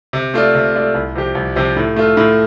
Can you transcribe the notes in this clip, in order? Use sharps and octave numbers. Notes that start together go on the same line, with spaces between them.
C3
A3 F4 D5
C3
A3 F4 D5
C2
C3 F3 C4 G4
C2
C3 F3 C4 G4
A2
A3 F4
A2